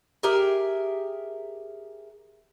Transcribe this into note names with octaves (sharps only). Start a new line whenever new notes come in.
G4 G#4 A#4 E5